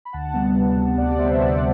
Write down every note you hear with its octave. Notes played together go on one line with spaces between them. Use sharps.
B5
D2 F#5 A5
C3 G3 B3
D2
C3 G3 B3
D2 D5 F#5
C3 G3 B3 C5 E5
D2 D5 F#5